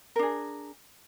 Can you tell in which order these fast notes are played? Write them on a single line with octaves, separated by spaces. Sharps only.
A#4 D4 G#4